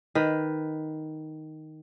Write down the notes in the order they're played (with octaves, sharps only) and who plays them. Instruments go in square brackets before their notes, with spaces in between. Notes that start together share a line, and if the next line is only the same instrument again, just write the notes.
[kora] D#3 B4